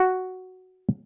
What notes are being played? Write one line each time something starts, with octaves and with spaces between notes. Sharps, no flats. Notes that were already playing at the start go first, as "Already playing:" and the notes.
Already playing: F#4